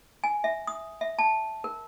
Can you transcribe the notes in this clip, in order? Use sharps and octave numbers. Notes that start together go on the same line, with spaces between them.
G#5
E5
D#6
E5
A5
A#4